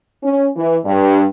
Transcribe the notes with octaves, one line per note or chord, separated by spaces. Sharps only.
C#4
E3
G2